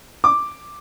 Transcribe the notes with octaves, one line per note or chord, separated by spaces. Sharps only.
D6